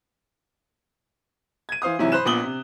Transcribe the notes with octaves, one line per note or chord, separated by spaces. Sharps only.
G#6 D#7
E3 C5 F5 D#6
G#2 C3 E3 F#3 E4
C5 B5 F#6 E7
A#1 A#2 B3 D#6 F#7 G7
C3